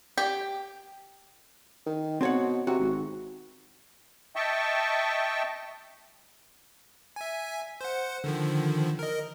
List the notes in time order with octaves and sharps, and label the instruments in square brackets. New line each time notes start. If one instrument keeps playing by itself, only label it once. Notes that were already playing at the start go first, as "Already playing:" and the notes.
[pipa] G4
[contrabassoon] D#3
[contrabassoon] B2 [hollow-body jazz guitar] C4 C#5 F#5
[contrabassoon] C3 [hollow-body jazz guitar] F#4
[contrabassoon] G#1
[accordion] D#5 E5 G5 A5 C#6
[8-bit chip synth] E5 G#5
C5 F#5
D3 D#3 F3
A#4 D#5